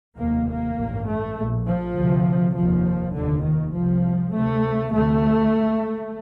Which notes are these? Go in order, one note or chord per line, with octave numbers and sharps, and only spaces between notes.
F1 D#2 A#3
A#3
A1 G2
A3
A#1 A#2
F3
D2 C3
F1 D#2 F3
F1 D#2 D3
D#3
C2 C3 F3
D2 C3 A3
D2 C3 A3